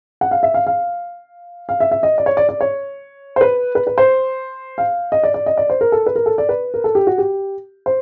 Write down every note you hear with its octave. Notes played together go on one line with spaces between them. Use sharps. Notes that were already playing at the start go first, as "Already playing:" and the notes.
F#5
F5
E5
F5
F5
F5
E5
E5
D#5
D5
C#5
D5
D5
C#5
C5
B4
B4
B4
C5
F5
D#5
D5
D5
D#5
D5
C5
A#4
A4
B4
A#4
A4
D5
B4
A#4
A4
G4
F#4
G4
C5